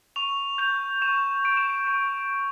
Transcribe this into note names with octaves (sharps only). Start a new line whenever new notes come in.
C#6 F7
G6 F7
C#6 E7
G6 D7
E7
D7
C#6 D7
G6